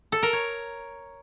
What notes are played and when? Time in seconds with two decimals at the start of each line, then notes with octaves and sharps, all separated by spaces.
0.12 A4
0.23 A#4
0.33 C#5